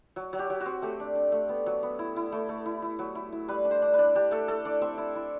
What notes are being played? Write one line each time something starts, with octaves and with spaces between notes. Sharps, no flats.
F#3
F#3
G4
F#3
F#4
C4
A3 G4
D4
D4
A3
B3
F#3
B3
E4
E4
A3
A3
E4
E4
F#3
E4
E4
G3 B4
D4
C5
D4
B4
D4
D4 G4
A3 A4
A3 A4
D4 D5
C4 E5
E4
E4